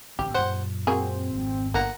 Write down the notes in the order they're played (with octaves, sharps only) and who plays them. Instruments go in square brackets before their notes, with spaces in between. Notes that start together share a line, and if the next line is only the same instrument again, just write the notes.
[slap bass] A1 D3 C4 [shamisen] G4
[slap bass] F#2 A#2 [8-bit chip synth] C5 F#5
[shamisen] F#3 A#3 G#4 [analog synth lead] C4
[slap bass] G#1 F2
[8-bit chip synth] G1 F#5 A#5 [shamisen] A#3